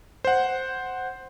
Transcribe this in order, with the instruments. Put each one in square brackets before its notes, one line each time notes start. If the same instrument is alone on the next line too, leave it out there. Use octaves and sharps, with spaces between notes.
[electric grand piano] C5 F#5